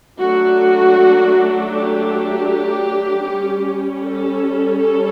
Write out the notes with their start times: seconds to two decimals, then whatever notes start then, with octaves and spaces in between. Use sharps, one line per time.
0.18 F#3 A3 D4 F#4
1.72 G4
3.26 G3 C#4
4.02 A4
4.79 A4